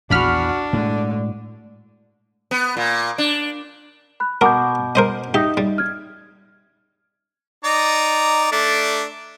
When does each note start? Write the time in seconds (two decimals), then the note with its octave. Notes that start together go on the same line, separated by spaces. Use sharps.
0.10 A#1 E2 D4 F#4 B5 F6
0.73 A2 D3 G#3
2.51 B3
2.77 A#2
3.18 D4
4.20 B5 F#6
4.41 B2 A#4 F#5 D6 G6
4.95 A#4 C5 D#5
5.34 D#4 G4 E5
5.57 G3
5.78 F6 G#6
7.64 D#4 D5 A#5
8.52 A3 D4 D5